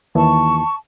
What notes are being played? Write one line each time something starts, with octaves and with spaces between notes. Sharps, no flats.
D#2 E3 A5 C#6